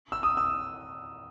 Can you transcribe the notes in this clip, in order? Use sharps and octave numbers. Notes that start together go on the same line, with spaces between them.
E6
D#6
E6